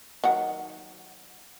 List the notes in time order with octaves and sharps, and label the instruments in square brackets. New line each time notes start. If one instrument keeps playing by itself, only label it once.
[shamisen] D#3 F#3 F#5